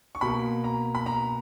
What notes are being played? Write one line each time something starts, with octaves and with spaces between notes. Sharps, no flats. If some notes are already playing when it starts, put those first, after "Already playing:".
C#6
B2 A#3 B5
A#5
B5
A#5